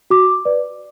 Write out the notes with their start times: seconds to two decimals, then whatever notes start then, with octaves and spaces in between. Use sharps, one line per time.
0.10 F#4 D6
0.45 B4 D5